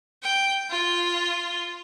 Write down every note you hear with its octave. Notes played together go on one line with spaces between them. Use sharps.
G5
F4